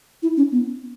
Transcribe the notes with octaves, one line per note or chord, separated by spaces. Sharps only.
E4
C#4
B3